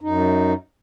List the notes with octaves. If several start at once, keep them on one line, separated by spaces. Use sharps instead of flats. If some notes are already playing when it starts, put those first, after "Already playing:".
F#2 D#4